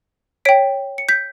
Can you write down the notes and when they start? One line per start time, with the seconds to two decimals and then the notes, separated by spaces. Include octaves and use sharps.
0.45 C#5 G5 B6 D7
0.98 C#7
1.09 G6 B6